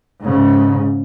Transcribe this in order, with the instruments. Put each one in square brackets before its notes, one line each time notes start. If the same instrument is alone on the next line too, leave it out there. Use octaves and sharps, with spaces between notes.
[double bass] G#2 C#3